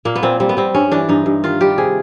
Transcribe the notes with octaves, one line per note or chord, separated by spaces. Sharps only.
A#2 A#3
B3
A#2 C4
G3 C4
B3
G3 C4
G2 C#4
E3 D4
G2 D#4
G2
D#3 F4
G3 G4
C3 G#4